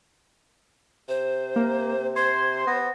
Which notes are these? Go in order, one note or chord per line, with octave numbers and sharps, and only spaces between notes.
C3 C5
A#3
C5 C6 G#6
B3 A#6